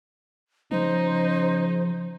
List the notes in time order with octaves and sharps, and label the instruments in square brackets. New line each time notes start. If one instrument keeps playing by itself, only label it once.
[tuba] C#3 [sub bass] F3 [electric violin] D#4 [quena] C5